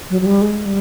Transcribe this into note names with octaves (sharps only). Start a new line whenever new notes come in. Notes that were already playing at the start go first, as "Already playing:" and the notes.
F#3
F#3
G3
G#3
G3